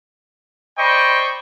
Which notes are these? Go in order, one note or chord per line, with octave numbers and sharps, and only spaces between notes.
C5 D5 D#5 G5 B5 C#6